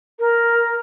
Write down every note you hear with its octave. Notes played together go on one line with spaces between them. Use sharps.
A#4